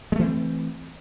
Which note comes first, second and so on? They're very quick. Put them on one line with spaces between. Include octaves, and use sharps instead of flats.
G#3 A3 E3 C4